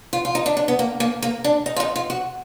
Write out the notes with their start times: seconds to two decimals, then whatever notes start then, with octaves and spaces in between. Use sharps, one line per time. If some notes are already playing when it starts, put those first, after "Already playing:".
0.13 F4
0.25 F4
0.35 D#4
0.46 D4
0.57 D4
0.68 B3
0.79 A#3
1.00 A#3
1.22 A#3
1.44 D4
1.66 D#4
1.76 F4
1.80 D#4
1.96 F4
2.10 F#4